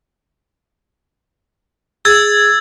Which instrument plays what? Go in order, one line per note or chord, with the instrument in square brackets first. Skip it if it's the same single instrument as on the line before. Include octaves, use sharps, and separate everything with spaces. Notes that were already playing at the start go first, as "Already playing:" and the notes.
[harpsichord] G#4 [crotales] E6 G#6 A6